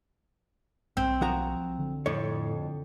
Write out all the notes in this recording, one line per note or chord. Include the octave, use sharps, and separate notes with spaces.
B1 C4
F3 F#4 A#5
D3
F2 A2 C#5